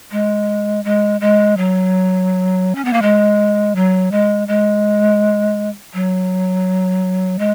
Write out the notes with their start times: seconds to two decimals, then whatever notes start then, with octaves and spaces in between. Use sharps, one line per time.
0.11 G#3
0.85 G#3
1.21 G#3
1.57 F#3
2.75 C#4
2.85 B3
2.93 A#3
3.02 G#3
3.75 F#3
4.12 G#3
4.48 G#3
5.94 F#3
7.39 G#3